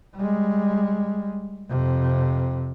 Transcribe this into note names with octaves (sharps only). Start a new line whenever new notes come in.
G3 G#3
F2 C3